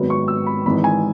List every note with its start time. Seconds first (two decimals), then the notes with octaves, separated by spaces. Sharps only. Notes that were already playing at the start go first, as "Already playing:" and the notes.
Already playing: G#1 G#2 F#3 B3
0.10 C#6
0.28 E6
0.47 B5
0.65 G#1 G#2 E3 B5
0.84 G#5